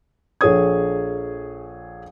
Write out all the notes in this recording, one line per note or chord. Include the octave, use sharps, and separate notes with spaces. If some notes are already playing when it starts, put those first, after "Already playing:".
A#1 G#4 A4 C#5 D#6 G#6